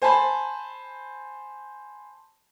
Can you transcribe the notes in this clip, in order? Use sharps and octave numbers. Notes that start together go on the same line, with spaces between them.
C5 G#5 A5 B5